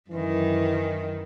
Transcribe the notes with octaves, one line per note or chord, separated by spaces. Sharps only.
F#2 D#3 E3